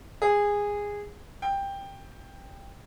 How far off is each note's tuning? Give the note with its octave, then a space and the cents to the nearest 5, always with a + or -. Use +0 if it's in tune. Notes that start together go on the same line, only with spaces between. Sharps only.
G#4 -15
G5 +10